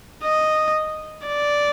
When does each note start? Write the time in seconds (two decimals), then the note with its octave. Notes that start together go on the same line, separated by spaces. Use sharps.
0.24 D#5
1.27 D5